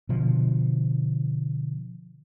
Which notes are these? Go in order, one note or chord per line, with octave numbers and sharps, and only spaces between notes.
B2 D3 F3